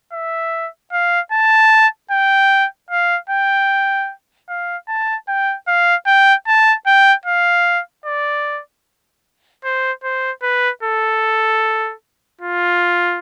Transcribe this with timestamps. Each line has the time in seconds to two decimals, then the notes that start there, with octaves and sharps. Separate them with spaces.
0.13 E5
0.92 F5
1.32 A5
2.11 G5
2.90 F5
3.30 G5
4.49 F5
4.88 A5
5.28 G5
5.68 F5
6.07 G5
6.47 A5
6.86 G5
7.26 F5
8.06 D5
9.64 C5
10.04 C5
10.43 B4
10.83 A4
12.41 F4